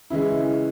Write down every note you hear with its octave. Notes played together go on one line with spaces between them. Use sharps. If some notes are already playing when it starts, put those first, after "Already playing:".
C#3 E3 G#3 E4